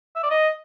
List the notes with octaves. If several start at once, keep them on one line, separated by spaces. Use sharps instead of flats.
E5
D5
D#5